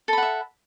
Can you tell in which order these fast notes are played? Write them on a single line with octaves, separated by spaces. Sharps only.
A4 B5 F#5 E5